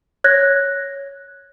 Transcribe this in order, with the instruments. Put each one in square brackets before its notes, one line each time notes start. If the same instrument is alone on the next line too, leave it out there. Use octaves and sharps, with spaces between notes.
[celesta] C#5 F#6 G#6 A#6